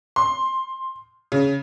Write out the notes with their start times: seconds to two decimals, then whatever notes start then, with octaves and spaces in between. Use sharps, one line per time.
0.16 C6
1.32 C#3